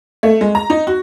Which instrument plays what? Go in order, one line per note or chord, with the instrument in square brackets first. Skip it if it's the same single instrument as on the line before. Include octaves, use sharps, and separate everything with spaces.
[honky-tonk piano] A3
G#3
A#5
D#4
F#4